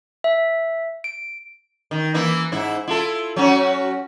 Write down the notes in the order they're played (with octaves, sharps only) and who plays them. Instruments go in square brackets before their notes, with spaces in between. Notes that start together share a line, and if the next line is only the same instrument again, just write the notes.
[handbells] E5
D7
[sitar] D#3
E3 A#3 E4
G#2 E4
E4 F4 A4
F#3 C#4 F#4